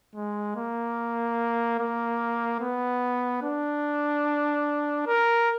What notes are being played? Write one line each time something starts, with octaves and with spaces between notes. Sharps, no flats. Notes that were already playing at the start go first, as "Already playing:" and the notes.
G#3
A#3
A#3
B3
D4
A#4